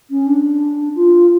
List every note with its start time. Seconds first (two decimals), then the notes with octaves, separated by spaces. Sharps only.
0.10 C#4
0.26 D4
0.95 F4